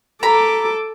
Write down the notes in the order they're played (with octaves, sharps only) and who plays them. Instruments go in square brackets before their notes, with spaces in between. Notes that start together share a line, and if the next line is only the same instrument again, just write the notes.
[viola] A4 D6 [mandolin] A#5 B5